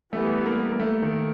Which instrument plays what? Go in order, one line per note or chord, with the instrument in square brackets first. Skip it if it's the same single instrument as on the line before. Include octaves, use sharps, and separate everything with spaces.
[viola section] E3 G3 B3 [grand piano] A3
[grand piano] A#3
A#3
A3
D#3